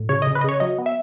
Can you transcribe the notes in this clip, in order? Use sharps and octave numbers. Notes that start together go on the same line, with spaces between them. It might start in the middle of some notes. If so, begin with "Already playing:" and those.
Already playing: A2
C#3 C#5
D#5
C#3
B4
D#5
C#3 C#5
F#3 D#5
B3
E5